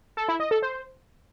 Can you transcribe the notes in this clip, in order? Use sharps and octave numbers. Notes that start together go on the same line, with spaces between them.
A4
E4
D#5
A4
C5